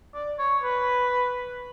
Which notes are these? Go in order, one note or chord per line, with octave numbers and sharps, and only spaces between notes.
D5
C#5
B4